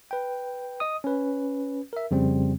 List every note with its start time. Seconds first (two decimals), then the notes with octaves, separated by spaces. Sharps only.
0.11 B4 G5
0.80 D#5 D#6
1.04 C#4 B4
1.93 A#4 E5
2.11 F2 C#3 G3 C4